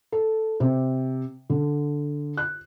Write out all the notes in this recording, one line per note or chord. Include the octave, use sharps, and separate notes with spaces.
A4
C3
D3
F#6